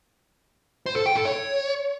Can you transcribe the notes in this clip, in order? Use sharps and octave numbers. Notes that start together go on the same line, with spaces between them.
C5
A4
G5
A4
C#5